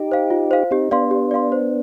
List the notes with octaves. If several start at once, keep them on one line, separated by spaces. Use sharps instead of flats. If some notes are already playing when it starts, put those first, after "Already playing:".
Already playing: D#4 G4
C5 F5
F4
C5 F5
C4 D#4 G4
B3 D4 D5 F5 C6
G4
D5 F5 C6
C5